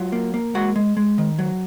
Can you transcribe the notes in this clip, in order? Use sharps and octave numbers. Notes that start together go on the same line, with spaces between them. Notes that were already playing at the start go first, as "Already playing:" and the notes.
Already playing: F#3 F4
A#3
A#3
G#3 F#4 F#5
G#3
G#3
D#3
F#3